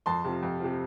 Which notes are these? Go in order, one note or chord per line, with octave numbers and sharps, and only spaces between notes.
F2 A5 C6
C3 F3
F2
C3 F3